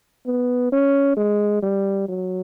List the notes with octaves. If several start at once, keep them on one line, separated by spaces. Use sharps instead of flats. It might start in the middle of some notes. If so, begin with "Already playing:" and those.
B3
C#4
G#3
G3
F#3